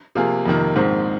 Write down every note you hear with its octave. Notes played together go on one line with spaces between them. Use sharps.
C3 F3 A#3 F4 G#4
F2 C3 D#3 A#3
A#1 G#2 D#3 C4